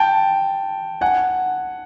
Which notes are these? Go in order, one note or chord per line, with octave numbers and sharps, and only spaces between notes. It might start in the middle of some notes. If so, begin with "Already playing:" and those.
Already playing: G5 A5
F#5 G#5